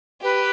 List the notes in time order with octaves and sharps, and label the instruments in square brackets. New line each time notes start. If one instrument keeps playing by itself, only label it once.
[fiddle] G4 [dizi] B4